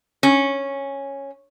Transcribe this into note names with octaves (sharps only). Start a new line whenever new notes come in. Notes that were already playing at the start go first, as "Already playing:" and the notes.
C#4